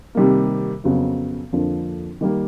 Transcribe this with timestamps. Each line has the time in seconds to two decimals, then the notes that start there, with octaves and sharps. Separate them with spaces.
0.15 C3 D#3 G3 A#3
0.84 F2 C#3 F#3 B3
1.53 F2 D3 F3 A#3 D4
2.21 D#3 G3 A#3